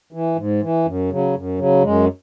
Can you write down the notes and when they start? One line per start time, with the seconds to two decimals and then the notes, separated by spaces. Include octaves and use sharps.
0.12 E3
0.36 G#2
0.62 E3
0.86 F#2
1.11 C#3 F#3
1.35 F#2
1.58 C#3 F#3
1.83 F#2 G#3